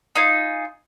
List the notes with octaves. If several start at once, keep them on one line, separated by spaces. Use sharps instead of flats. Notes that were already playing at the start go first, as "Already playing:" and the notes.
D#4 F4 G#5